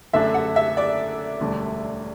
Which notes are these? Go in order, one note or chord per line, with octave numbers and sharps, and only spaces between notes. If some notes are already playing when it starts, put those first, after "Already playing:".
F#2 D3 A3 D4 E5
F#5
E5
D5
E1 D2 D3 G3